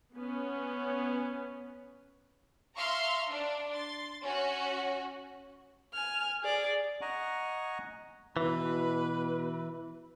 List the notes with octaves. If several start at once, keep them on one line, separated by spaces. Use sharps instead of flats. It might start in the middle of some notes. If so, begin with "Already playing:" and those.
B3 C#4
E5 F5 A#5 C6 C#6 F6
D4
C6 A6
C#4 F#4
G#5 F6
G#4 D5
D#5 F#5 G#5 A#5 C#6
B2 E3 B4